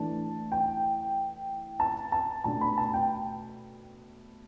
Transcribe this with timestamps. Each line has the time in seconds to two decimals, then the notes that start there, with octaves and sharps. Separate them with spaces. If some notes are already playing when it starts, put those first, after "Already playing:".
Already playing: E3 A3 D4 A5
0.52 G5
1.80 A5
2.12 A5
2.44 B2 A3 D4 A5
2.61 B5
2.78 A5
2.94 G5